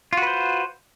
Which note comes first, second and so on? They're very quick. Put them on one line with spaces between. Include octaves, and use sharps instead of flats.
F4 F#4 B4 C5